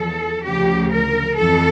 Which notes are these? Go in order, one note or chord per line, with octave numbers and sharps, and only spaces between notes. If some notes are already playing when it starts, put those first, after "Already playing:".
Already playing: E2 F3 A4
D2 C#3 F3 G4
A#4
F2 E3 A4